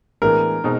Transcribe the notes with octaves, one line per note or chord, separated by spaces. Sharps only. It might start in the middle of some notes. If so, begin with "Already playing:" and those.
A2 E3 G#3 B3 D4 A#4
B2 G#3 C4 D#4